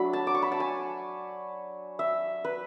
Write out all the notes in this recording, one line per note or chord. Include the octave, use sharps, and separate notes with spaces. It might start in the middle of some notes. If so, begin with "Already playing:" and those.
Already playing: F#3 A3 D4 B5
A5
D6
C#6
B5
A5
G#5
E5
B4